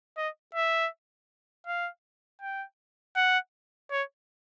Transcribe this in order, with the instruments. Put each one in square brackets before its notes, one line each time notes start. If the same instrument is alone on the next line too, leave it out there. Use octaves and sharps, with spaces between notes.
[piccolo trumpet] D#5
E5
F5
G5
F#5
C#5